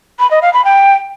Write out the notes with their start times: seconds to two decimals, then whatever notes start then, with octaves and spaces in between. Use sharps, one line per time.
0.19 B5
0.31 D#5
0.42 F5
0.53 B5
0.65 G5